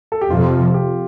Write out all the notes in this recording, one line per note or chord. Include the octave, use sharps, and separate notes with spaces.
A4
G4
F2 C3 F3 F4
G4